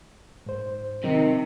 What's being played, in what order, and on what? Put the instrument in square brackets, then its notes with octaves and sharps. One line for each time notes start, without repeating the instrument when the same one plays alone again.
[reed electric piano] G#2 C5
[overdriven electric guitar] C3 [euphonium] D#3 [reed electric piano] F#3 D#4